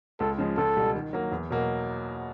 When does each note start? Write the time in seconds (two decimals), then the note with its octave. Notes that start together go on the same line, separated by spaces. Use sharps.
0.20 C#2 A4
0.38 C#3 F3 G#3
0.57 C#2 A4
0.76 B2 G3
0.95 D#3
1.13 F#3 A#3
1.32 E2
1.50 B2 F#3 A#3